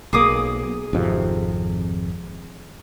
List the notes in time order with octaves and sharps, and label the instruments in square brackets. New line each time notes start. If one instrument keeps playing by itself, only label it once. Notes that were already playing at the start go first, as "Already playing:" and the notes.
[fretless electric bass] B1 A#3 [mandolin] G#4 D6 D#6
[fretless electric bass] G#1 F2 C3